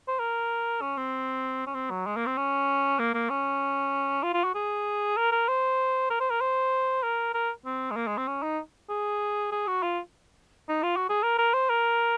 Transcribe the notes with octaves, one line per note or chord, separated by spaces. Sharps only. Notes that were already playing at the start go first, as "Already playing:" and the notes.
C5
A#4
C#4
C4
C#4
C4
F#3
G#3
A#3
C4
C#4
A#3
A#3
C#4
F4
F4
F#4
G#4
A#4
A#4
C5
A#4
C5
A#4
C5
A#4
A#4
C4
G#3
A#3
G#3
C4
C#4
D#4
G#4
G#4
F#4
F4
D#4
F4
F#4
G#4
A#4
A#4
C5
A#4